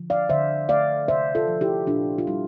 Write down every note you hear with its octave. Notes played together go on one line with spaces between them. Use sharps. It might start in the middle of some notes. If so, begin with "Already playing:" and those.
Already playing: D3 F3
D5 F5
D3 C5 E5
A3 D5 F5
C3 C5 E5
F4 A4
F3
E4 G4
A#2 D4 F4
F4
G3 E4